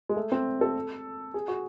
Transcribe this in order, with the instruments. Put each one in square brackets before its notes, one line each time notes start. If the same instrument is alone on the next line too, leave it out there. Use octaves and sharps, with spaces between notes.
[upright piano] G#3
A3
C4
A4
G#4
F#4